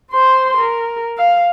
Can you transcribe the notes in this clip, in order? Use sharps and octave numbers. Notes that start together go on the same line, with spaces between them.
C5 C6
A#4
F5